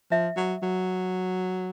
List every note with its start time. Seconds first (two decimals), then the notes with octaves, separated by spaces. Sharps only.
0.11 F3 E5
0.37 F#3
0.63 F#3